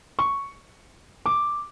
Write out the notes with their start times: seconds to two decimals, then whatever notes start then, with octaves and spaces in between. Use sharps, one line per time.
0.19 C#6
1.26 D6